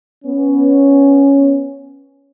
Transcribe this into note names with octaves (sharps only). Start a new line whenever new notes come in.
B3 C#4